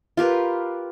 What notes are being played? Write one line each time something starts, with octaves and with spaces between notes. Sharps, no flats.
F4 G4 A#4 B4